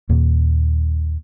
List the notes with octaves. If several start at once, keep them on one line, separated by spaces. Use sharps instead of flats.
D#2 A#2 A#3